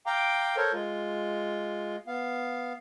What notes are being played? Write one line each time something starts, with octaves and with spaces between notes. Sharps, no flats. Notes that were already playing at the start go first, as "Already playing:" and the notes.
F5 G5 A#5 D6
A4 A#4 C5 C#5
G#3 F4
B3 F5